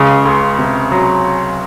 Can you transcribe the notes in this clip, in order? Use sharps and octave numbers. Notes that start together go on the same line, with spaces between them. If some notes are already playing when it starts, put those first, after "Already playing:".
Already playing: C#2 C#3
C#2
C3
F#3